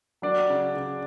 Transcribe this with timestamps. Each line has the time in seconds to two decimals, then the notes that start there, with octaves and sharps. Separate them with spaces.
0.22 F#3 D4 D5
0.49 C#3
0.75 C#3